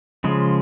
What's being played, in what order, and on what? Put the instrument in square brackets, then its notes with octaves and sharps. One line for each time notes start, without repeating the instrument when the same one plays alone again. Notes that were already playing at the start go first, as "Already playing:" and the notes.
[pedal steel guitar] C#3 F3 G#3